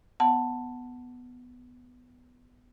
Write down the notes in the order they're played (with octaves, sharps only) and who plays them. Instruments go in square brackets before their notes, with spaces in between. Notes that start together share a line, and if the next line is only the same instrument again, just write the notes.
[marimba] B3 F#5 A5